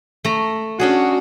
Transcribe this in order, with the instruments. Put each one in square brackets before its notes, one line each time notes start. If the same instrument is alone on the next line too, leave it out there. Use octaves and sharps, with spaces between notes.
[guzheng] A3 A#5
[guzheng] C#4 D4 G#4 [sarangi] F#4